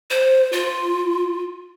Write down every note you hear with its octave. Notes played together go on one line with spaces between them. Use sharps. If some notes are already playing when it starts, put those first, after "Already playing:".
C5
F4